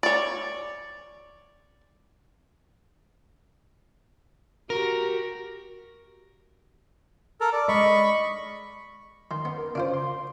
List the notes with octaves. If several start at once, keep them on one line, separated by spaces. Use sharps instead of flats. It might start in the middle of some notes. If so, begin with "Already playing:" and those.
C#5 D5
F#4 G4 A#4
A4 A#4
D5
G#3 D5 D#5 B5 C#6
D#3 C6
B3
A#4
C#3 D4 F4 C5
C6